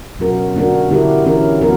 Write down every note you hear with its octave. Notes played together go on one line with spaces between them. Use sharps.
B2 F#3 C#4 F#4 A#4
D3 A#3 D4 F#4 A#4
D3 A#3 E4 G4 A#4
E3 A#3 C#4 E4 A#4
F#3 B3 F#4 A#4